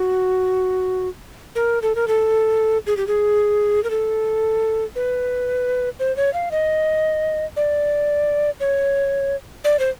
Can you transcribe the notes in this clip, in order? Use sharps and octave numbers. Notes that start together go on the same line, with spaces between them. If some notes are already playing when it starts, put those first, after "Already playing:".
Already playing: F#4
A#4
A4
A#4
A4
G#4
G4
G#4
A#4
A4
B4
C5
C#5
F5
D#5
D5
C#5
D5
C5